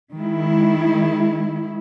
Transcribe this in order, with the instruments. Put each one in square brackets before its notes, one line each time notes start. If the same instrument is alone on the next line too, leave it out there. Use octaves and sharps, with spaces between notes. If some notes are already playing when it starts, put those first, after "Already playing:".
[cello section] D#3 G#3 E4